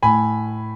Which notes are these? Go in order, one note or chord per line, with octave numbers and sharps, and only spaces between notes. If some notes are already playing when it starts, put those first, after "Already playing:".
A2 G#5 B5